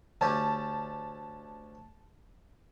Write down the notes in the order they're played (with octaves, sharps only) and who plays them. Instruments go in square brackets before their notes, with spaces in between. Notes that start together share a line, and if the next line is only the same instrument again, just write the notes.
[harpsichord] D2 C#4 G4 [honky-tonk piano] A5